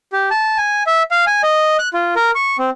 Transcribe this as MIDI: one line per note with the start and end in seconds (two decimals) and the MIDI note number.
0.13 0.29 67
0.31 0.58 81
0.58 0.83 80
0.87 1.03 76
1.11 1.25 77
1.27 1.42 80
1.43 1.77 75
1.79 1.89 90
1.93 2.14 65
2.16 2.31 70
2.35 2.57 85
2.58 2.70 60